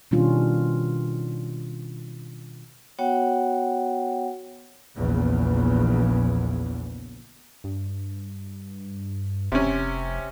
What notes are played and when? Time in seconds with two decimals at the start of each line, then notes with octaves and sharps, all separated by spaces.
0.11 B2 D#3 G3 C#4 D4 F4
2.99 B3 F#4 C#5 F#5 G5
4.96 A#1 E2 C#3
7.64 G2
9.52 F1 C3 C#4